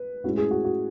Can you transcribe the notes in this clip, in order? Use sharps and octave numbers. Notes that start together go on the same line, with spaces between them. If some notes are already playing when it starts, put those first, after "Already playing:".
Already playing: B4
A2 G#3 C#4 E4 F#4
G#4
F#4
F#4